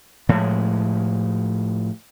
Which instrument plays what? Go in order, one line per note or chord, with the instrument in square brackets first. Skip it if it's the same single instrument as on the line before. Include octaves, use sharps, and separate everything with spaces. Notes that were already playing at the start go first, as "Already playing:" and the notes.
[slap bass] A2 F3 G#3